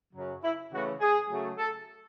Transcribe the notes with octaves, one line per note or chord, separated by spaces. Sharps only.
F#2 C#3 F#3
E4
C#3 E3 A3 F#4
G#4
C#3 F#3 A3
A4